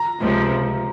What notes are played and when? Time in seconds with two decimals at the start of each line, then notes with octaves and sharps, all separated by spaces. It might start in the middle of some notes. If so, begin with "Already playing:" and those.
Already playing: A#5
0.21 C#2 C3 F3